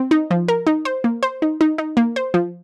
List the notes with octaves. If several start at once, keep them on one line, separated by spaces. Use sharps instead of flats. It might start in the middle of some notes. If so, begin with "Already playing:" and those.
Already playing: C4
D#4
F3
A#4
D#4
C5
A#3
C5
D#4
D#4
D#4
A#3
C5
F3